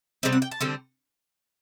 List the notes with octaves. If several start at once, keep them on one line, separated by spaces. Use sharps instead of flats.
C3 G3 C4 D#5
F#5
G5
A5
D3 G3 C4